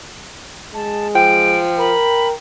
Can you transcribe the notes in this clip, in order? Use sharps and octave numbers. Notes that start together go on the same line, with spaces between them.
G#3 A5
F3 G5 D7
A#4 B5